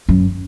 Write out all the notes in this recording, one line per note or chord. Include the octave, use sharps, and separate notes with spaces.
F#2